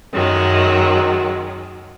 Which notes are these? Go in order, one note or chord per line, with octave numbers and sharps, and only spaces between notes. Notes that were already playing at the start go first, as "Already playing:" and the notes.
F#2 D#3 F#3 G#3